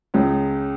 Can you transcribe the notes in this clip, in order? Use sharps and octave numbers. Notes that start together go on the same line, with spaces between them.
C#2 C#3